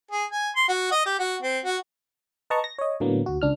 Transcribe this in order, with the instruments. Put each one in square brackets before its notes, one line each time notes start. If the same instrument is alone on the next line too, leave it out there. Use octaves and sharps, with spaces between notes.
[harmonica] G#4
G#5
C6
F#4
D#5
G4
F#4
C4
F#4
[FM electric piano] B4 D#5 A5 A#5 C#6
A#6
C#5 D#5
A2 D3 F#3 A#3 B3
D2 F#4
C#2 D4 F6